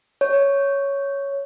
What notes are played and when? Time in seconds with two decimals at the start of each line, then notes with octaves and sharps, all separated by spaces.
0.21 C#5